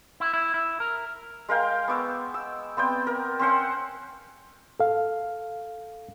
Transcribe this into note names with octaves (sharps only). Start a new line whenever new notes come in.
E4
E4
E4
A#4
G#3 A#4 F5 G5
B3 C#6 D6 E6
E6
B3 C4 D5 G5
A#4
C4 C#4 C5 F#5
A4 F5